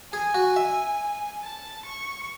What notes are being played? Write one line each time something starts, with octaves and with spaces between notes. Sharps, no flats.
G#4 G#5
F#4
E5
A5
C#6